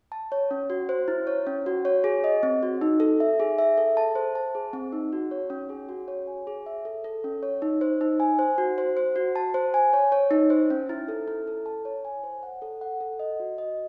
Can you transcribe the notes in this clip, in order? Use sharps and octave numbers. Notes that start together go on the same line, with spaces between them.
A5
C#5
C#4
F#4
C5
E4
C#5
C#4
F#4
C#5
G#4
D#5
C4
F#4
D#4
A4
E5
G#4
E5
A4
A5
C5
A5
G#4
C4
D#4
F#4
C#5
C#4
G#4
F#4
C#5
G#5
G#4
E5
A4
A4
C#4
C#5
D#4
C5
D#4
G#5
C5
F#4
C5
C5
F#4
A5
C5
G#5
C#5
C#5
D#4
C5
C#4
E4
A4
E4
A4
A5
C#5
G#5
C5
F#5
A4
F#5
A4
D#5
F#4
D#5